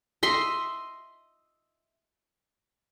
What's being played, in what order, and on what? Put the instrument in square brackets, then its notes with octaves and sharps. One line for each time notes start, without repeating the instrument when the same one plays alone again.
[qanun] D#5 E5 C6